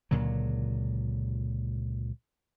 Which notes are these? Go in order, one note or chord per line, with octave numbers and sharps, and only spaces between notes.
C#2 A#2 D3 F#3